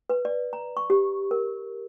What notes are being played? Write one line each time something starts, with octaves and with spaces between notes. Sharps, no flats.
B4
D5
A#5
C#6
G4
A#4